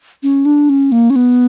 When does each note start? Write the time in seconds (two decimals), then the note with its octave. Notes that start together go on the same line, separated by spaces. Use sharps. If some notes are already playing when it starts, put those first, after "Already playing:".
0.23 C#4
0.45 D4
0.70 C#4
0.92 A#3
1.10 C#4
1.16 B3